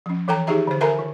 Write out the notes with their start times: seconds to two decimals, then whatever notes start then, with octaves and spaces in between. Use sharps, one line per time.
0.06 F3 C#4
0.28 E3 A4 G5 A#5
0.47 D#3 D#4 G4 G#4 E5 A#5
0.67 D3 C5
0.81 A4 A#4 E5 G#5 A#5 B5
0.99 D#3